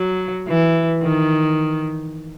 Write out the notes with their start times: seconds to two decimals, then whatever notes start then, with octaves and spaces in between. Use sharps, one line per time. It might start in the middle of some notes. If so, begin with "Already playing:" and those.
Already playing: F#3
0.47 E3
1.02 D#3